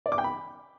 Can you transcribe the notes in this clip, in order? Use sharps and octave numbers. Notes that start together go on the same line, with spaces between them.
D5
D6
G5
B5